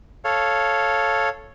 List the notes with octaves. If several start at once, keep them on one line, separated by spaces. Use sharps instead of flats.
A4 C#5 F5